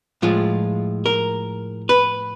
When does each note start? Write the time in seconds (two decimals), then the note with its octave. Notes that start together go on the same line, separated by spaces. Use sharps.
0.22 A2 F3 G#3 F4
1.06 A#4
1.89 B4